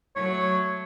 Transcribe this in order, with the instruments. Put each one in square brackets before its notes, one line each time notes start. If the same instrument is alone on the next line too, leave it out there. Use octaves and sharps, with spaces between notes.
[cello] F#3 A3 [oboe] C#5